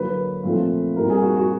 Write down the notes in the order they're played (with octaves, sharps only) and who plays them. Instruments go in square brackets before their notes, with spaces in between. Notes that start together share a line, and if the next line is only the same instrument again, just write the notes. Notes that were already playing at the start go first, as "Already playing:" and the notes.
Already playing: [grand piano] D3 F#3 A#3 B4
A#2 F3 A3 C4
A#2 G3 C4 A#4
G#4
F#4
F#4